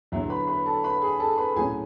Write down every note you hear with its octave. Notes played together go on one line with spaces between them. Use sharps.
E2 D3 F#3 E4 E5
B4 B5
B4 B5
A4 A5
B4 B5
G#4 G#5
A4 A5
B4 B5
A2 F#3 C#4 G#4 G#5